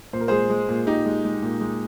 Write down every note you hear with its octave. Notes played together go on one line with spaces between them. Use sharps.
A#2 C5
A#4
G#3 G#4 C5
G#3
A#2
A#2 D#4 G4
G#3
G#3
A#2
G#3